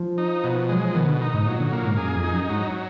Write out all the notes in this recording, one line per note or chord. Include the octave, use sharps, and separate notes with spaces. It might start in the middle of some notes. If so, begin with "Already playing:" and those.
Already playing: F3
D#4
B2
F#3 G#3
F3
B2 D#3
D3
D#4
G#2
A#2 F#3
D3
A#2 A#3
G#2
F#2 G#4
F2
D#4
F#2
G#2 F#3